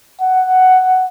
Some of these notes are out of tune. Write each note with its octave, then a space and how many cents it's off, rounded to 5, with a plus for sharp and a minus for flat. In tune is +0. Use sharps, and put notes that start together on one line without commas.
F#5 +5